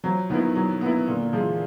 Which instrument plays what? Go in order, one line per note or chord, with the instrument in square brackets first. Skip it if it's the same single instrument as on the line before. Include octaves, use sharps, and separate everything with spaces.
[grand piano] F3 [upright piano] F#3
[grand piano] D#3 [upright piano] B3 E4
[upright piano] F#3
B3 E4
[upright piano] A#2 [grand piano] D3
[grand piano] D3
[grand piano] E3 [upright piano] F3 G#3